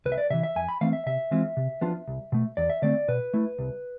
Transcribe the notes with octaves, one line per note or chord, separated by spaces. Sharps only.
C2 B4
E5
D5
C3 E3 E5
E5
F2 G#5
B5
E3 A3 C4 F5
E5
C3 E5
E3 G#3 C4 F4
C3
F3 B3 D4 F4
C2
B2 A3
E2 D5
E5
D3 A3 C4 D5
B2 B4
A3 E4
C2